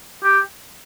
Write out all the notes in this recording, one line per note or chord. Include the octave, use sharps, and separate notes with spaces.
G4